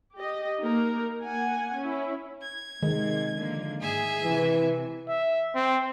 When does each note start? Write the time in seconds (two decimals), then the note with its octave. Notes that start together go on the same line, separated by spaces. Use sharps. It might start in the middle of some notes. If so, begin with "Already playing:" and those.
0.16 G4 D#5
0.61 A#3 D#4 A#4
1.24 A#3 F#5 G#5
1.77 C#4 E4
2.42 G#6
2.82 C3 D#3 G#3
3.36 D3 F3 A#3
3.81 G#2 G#4 E5 G#5
4.24 C3 E3
5.08 E5
5.55 C4